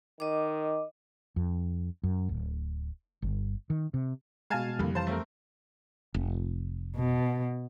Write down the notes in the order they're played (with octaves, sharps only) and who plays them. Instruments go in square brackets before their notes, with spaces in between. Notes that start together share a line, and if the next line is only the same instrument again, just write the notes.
[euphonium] D#3 [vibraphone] D#5 D6
[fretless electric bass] F2
F#2
D1
G1
D#3
C3
[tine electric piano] B2 G#3 [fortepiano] F5 G#5 A5
[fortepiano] C2 [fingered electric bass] F2 G3 [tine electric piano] D3 A#3
[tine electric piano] E3 F5 [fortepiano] C5 A5
[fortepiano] A3 C4 A#4
[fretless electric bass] F1
[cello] B2